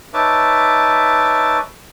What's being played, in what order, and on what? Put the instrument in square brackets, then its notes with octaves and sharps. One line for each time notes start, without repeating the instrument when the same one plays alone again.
[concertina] D#4 B4 C#5 E5 A5 D6